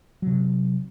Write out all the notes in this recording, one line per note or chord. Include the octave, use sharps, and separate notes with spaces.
C3 F#3